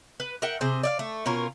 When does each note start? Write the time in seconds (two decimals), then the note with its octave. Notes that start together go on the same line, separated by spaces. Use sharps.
0.20 B4
0.42 A#4 E5 F#5 G5
0.61 C3 G#4 C5
0.83 D5 E5 F5
0.99 A3
1.26 B2 C#4 F4 A#4